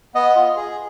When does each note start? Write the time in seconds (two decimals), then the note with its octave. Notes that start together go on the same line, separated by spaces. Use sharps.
0.14 B3 D#5
0.36 F4
0.56 G#4